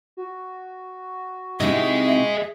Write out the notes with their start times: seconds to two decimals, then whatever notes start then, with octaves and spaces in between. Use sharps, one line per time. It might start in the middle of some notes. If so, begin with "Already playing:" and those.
0.17 F#4
1.60 C3 D#4 E4 G#4 D#5 E5